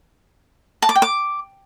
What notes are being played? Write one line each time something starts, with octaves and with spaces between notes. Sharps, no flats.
A5
D6
G5
D6